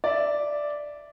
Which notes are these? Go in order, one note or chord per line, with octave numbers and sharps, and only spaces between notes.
D5 E5